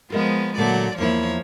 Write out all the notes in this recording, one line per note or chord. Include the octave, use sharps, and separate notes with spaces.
F3 G#3 B3 F4 A#4 D#5
A#2 D3 F#3 A3 D5
E2 F3 A#3 E4 C#5